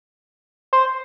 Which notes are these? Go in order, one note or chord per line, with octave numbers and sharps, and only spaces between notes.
C5